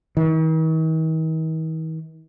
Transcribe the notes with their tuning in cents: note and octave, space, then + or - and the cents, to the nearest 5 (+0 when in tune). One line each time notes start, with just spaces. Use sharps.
D#3 +45